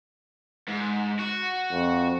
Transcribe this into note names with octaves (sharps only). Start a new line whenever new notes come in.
G#2
F#4
F2